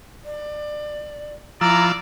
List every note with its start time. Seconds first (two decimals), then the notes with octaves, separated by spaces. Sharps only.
0.24 D5
1.61 F3 E4 D5 A#5 E6